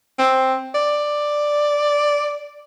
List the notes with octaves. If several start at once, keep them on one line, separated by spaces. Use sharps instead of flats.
C4
D5